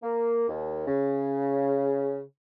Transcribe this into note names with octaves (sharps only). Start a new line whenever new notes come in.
A#3
D#2
C#3